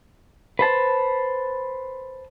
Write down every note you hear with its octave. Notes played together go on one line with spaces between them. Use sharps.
B4 C5 A5